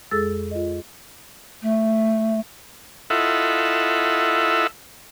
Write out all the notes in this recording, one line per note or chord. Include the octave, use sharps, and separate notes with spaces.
F2 G#3 G#4 A4 E6 A6
F4 D#5
A3
E4 F4 A4 D#5 E5 F#5